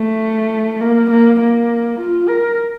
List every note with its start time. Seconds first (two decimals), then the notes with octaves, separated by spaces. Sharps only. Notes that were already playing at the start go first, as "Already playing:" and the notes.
Already playing: A3
0.81 A#3
1.10 A#3
1.40 A#3
1.99 F4
2.28 A#4